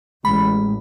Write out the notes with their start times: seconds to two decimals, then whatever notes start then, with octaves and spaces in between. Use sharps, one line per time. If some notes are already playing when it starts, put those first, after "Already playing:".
0.25 A1 G#3 B5